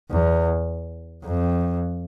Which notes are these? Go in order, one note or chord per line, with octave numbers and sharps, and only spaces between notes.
E2
F2